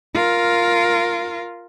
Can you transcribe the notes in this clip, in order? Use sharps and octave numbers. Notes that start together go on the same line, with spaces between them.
F4 A#4